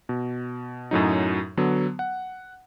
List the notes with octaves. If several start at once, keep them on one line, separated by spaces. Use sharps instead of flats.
B2
F#2 A2 F#3 D#4
D3 F#3 B3
F#5